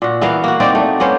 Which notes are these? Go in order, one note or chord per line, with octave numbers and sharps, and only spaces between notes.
A#2 F#4
E3 B3 A#4 F5
A#3 F#4
A#3 C4 D#4 D5
A3
A#3 B3 C#4 C5